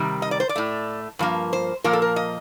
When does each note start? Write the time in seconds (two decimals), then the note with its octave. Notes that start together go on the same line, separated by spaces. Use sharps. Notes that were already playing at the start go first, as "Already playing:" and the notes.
Already playing: C3 D#3 G3
0.22 D#5
0.31 D5
0.40 C5
0.49 D5
0.56 A2 A3
1.19 G2 F3 A#3
1.53 C5
1.84 A#2 F3 A#3 A#4
1.93 A4
2.02 A#4
2.16 D#5